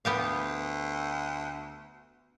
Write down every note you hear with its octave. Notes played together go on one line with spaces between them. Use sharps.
D2 B3 G4 F5